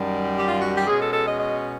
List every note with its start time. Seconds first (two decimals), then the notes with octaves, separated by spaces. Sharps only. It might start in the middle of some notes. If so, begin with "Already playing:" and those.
Already playing: F#2 D#3 G3
0.36 G4
0.48 F4
0.61 F#4
0.74 G4
0.87 B2 G#3 C#4 G#4
1.00 A4
1.13 A4
1.26 D#5
1.39 D#5